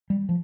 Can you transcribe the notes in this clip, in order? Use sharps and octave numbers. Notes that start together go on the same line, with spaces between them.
G3
F3